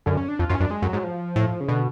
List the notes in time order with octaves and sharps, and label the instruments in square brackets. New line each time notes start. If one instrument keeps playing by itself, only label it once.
[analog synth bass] F#2 [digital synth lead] D3
[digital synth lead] C#4
D4
[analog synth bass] F2 [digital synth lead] F4
[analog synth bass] F#2 [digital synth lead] F4
[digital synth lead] C#4
[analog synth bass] F#2 [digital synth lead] D4
[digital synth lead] G#3
[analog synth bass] F#2
[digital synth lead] F#3
[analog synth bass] G#2
[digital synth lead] F3
[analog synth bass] A2
[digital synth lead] C#3
[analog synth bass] B2 [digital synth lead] D3